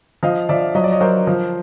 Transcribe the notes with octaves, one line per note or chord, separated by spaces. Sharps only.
F3 D#5 F5
F3 D5 E5
F#3 D#5
D5
C#5 D#5
F#3 A#4 C5
F3